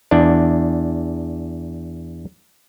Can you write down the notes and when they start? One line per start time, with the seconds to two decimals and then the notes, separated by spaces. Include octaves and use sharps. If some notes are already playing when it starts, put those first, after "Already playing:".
0.11 E2 D4